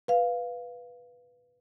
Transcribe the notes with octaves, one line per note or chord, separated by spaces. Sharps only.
B4 F5